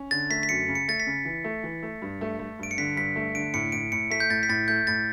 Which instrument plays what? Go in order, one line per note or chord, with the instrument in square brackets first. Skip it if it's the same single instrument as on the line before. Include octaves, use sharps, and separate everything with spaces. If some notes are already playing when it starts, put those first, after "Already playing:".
Already playing: [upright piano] C#4
[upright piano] D3 [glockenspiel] A6
[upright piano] A3 [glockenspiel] B6
[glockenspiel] B6
[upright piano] F#2 [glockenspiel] C#7
[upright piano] C#3
[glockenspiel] C#7
[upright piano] A3 [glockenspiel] A6
[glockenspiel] B6
[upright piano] C#3
E3
A3
E3
A3
G2
A3
A3
[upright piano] G2 [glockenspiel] D7
[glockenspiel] C#7
[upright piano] D3 [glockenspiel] B6
[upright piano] G2 [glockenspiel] B6
[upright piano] A3
[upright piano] D3 [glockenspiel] D7
[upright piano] A2 [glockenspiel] C#7
[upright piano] A2 [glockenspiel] D7
[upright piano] A2 [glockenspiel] C#7
[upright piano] A3 [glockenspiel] B6
[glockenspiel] G6
[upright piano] A2 [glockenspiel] A6
[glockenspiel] B6
[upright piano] A2 [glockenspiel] A6
[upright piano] A3 [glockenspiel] G6
[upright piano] A2 [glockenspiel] A6